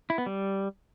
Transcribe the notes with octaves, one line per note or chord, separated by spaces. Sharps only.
E4
B3
G3